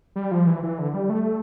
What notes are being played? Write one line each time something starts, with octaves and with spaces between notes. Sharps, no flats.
G3
F3
E3
E3
D3
G3
A3